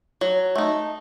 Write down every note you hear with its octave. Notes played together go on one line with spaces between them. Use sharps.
F#3
A3 D#4